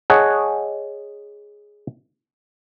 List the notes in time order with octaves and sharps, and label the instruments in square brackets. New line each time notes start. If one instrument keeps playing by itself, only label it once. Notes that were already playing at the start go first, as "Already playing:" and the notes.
[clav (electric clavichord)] G#4 C#5 D#5 F#5 A5